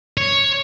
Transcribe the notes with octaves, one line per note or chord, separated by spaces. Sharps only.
C#5